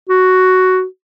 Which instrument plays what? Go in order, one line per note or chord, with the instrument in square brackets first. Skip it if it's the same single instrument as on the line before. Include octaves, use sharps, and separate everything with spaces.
[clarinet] F#4